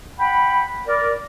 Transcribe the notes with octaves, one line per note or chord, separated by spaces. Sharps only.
F#5 G5 B5
A#4 D5